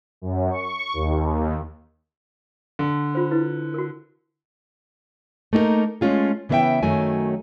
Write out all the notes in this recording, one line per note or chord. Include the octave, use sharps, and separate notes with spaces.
F#2
C#6
D#2
D3
F4 C5
E4 B4
F#4 A#4
A3 A#3 D#4 G4 A#4
G#3 A3 C#4 F4 G#4
C#3 E3 B3 B4 E5 G5
F#2 D#3 F#3 A3 G#5